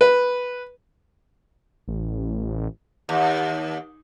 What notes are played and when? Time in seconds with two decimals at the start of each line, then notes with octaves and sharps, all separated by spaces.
0.01 B4
1.88 A1
3.09 D#2